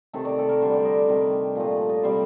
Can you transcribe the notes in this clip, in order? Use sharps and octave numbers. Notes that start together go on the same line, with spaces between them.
C3 D#3 A3 A4
D5
A4
A#4
D3 G3 C5
D5
D#5
C3 D#3 G3
A#2 F3 A3
D#5
D5
C3 G3 C5